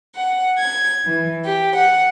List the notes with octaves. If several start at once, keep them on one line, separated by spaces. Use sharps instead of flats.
F#5
G#6
E3
G4
F#5